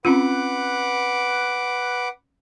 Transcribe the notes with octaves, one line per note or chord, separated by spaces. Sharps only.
C4 C#4 F4 B4 F#5 D6